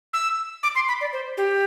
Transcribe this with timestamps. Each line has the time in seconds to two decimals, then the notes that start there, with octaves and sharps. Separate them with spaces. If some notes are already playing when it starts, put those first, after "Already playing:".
0.13 E6
0.63 D6
0.75 C6
0.88 B5
1.01 D5
1.13 C5
1.37 G4